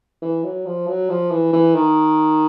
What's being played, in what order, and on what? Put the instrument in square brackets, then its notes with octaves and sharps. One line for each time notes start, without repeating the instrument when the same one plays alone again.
[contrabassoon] E3
F#3
F3
F#3
F3
E3
E3
D#3